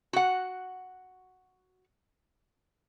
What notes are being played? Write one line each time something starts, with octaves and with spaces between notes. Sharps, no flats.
F#4 F#5